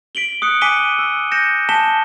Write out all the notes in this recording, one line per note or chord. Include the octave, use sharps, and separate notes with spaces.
B6 D7 F#7 G7
D#6 F#6 C#7
G#5 D6 B6 C#7 D#7 G7
E6
G6 A#6 C#7 E7
G#5 A5 B6 E7 G7